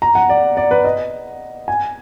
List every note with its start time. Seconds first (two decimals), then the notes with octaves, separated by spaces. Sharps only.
0.02 A#5
0.15 F#5
0.29 D5
0.57 D5
0.71 B4
0.85 D#5
1.68 G#5